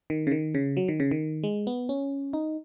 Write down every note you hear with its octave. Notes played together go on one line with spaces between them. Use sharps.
D#3
C#3
D#3
C#3
F#3
D#3
C#3
D#3
G#3
B3
C#4
D#4